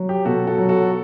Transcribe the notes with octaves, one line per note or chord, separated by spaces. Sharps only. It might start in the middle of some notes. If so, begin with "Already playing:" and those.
Already playing: F#3
G4
B2 F#4 A4
F#4 A4
F#3
F#4 A4